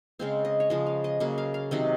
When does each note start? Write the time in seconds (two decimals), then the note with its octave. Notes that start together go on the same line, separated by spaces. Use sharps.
0.19 C#3 G#3 C4 F5
0.45 D#5
0.60 C#5
0.70 C#3 F3 G#3 D#5
0.87 F5
1.04 D#5
1.20 C#3 F#3 A#3 D#5
1.38 F5
1.54 F5
1.71 C3 D#3 F#3 C4 D#5